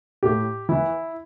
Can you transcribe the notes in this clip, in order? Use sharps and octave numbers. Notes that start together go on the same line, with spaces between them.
A2 G4
E3 E4